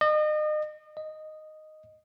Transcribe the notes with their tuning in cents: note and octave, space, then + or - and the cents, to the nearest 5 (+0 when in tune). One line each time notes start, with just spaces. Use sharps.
D#5 -35
D#5 -5